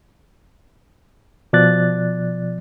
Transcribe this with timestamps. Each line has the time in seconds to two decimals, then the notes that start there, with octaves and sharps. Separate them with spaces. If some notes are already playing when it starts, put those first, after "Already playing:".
1.53 B2 F3 D5 F#6 A6